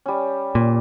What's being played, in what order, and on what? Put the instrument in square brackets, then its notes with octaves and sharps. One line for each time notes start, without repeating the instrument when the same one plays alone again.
[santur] G3 C#4
[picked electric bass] A#2